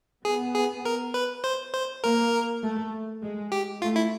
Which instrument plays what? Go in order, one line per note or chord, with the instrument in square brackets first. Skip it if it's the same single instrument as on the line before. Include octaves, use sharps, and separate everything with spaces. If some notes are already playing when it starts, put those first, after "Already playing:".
[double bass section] B3 [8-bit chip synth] G#4
[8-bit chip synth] G#4
A#4
B4
C5
C5
[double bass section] A#3 [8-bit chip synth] A#4
[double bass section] A3
G#3
[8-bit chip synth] G4
[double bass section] A3 [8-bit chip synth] F4
[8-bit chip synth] E4